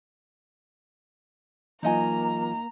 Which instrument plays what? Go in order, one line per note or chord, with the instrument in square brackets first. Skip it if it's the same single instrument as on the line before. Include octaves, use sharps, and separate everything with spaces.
[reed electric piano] E3 F#3 F4 [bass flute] A#3 [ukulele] D#4 D#5 G#5 [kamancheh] A#5